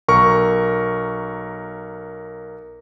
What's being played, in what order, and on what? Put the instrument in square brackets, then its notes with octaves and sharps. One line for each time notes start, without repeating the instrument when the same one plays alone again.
[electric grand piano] B1 A#4 C#6